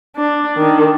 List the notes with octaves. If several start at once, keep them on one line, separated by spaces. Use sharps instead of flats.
D4
D#3 D4